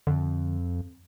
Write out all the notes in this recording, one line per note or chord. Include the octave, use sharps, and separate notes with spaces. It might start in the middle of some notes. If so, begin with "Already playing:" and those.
F2 D3